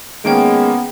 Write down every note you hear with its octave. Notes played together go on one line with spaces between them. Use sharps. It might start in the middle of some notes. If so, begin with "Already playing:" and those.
D#3 G#3 A#3 B3 C#4 G5 D7